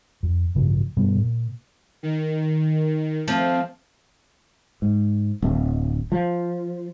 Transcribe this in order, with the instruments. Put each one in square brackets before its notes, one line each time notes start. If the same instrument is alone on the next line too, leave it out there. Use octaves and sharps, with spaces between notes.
[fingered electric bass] F2
A1 G2 C#3 F3
G2 B2 G3 B3
A#2
[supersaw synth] D#3
[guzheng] F3 [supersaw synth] A3 C4
[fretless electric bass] G#2
D1
F3